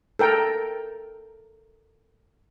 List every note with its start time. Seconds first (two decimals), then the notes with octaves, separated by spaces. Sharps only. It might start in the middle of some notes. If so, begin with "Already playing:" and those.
0.19 A4 A#4 G5